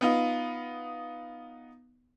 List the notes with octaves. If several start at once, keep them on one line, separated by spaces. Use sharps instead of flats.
B3 D#4 F4